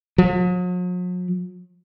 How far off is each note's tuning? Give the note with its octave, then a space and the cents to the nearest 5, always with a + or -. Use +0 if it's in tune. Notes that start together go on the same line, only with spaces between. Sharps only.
F#3 -45